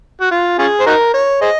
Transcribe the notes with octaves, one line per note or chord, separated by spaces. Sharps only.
F#4
F4
C#4 F4 G#4
C5
D#4 F#4 A#4
C#5
G#4 C5 D#5